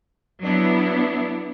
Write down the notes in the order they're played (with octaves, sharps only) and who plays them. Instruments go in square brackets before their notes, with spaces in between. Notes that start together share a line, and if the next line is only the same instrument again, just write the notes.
[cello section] F#3 B3 D4 E4